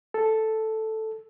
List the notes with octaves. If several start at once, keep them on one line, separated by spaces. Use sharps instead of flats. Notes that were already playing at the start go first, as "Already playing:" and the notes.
A4